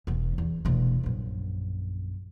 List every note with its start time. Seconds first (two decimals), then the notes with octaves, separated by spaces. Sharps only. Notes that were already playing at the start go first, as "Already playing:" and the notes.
0.07 E1 E3
0.38 E2
0.65 E1 A3
1.04 A#1 F#2